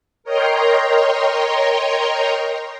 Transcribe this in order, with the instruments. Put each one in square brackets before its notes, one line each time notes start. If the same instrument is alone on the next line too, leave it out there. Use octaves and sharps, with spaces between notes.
[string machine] A#4 C#5 D#5 G5 A#5 C6